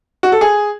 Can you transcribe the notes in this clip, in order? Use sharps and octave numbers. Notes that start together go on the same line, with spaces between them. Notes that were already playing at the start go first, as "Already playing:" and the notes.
F#4
A4
G#4